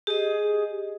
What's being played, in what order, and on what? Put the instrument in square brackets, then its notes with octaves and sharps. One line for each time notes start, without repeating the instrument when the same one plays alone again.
[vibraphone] G4 D#5 [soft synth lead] G#4